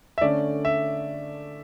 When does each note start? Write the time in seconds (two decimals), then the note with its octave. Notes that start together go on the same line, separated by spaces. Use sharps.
0.18 E5
0.21 D3 A3 C#4 D5
0.65 E5